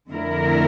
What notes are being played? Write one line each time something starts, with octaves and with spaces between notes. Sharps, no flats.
F2 D3 A3 E4 A#4